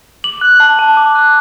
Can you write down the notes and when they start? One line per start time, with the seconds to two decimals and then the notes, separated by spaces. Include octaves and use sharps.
0.24 D6 F#7
0.41 F#6
0.60 A5
0.79 A5
0.97 D6
1.15 F#6